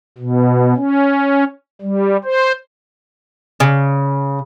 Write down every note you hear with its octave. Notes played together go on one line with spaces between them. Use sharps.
B2
C#4
G3
C5
C#3